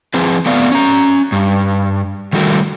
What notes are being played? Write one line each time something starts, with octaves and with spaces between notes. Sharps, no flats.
F3 C4 G#4 B4
A3 B3 D5 F5
C#4 A#5
G2
D#3 G3 A3 F#4 A#4